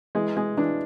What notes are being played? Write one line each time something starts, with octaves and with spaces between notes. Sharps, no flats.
E3 G#3
G#3
E3 D4